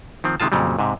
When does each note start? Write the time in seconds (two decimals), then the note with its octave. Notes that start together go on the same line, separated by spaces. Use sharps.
0.24 D#3 F3 C4
0.40 C3 D#3 G#3 F4 A5
0.52 F2 A#2 C#3 F#3 G3
0.79 G#2 C3